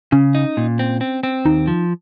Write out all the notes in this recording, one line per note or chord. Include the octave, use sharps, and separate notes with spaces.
C#3 C#4
D#4
A#2
C4
C4
C4
D#2 D#4
F3